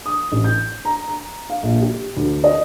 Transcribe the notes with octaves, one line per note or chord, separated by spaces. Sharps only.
D#6
A1
G6
A#5
A#5
F5
A#1
G4
D2
D#5